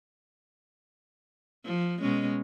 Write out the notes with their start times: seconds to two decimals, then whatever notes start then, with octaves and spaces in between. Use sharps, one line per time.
1.66 F3
2.00 B2 G#3 C#4